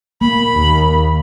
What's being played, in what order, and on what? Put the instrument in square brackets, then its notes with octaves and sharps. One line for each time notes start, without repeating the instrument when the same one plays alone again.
[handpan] A#3 [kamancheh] B5
[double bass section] D#2